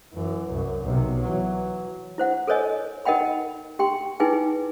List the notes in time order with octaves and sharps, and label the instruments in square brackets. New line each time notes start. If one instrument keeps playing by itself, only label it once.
[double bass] F#2 E3
C2 F#2
B1 C3
E3 F#3
[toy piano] E4 C5 F#5
A4 A#4 C5 C#5 D#5 G#5
D#4 A#4 D#5 F#5 G5 B5
G4 G5 C6
D#4 E4 G#4 B4 G5 G#5